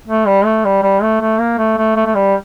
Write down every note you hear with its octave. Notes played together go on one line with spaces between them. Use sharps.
A3
G3
A3
G3
G3
A3
A3
A#3
A3
A3
A3
A3
G3